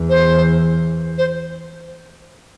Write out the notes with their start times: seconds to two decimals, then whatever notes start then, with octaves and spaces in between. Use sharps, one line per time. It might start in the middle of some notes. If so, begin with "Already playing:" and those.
Already playing: E2
0.10 C5
1.18 C5